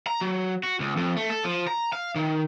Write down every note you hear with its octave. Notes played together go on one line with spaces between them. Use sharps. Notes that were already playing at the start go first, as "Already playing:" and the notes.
A#5
F#3
F#4
C#2
F2
A3
A4
F3
A#5
F5
D#3